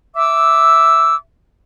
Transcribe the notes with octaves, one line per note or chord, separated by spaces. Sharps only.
E5 D6 E6